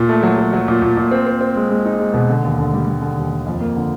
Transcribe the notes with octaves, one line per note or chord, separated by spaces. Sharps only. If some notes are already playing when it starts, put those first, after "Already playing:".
Already playing: A#2
A3
F#3
F#3
F#3
A#2
A#2
A#2
C4
C4
C4
G#3
G#3
D#4
G#3
B2
D3
D#2
D3
G3
G3
D3
D#2
D#2
F2
A#3
D3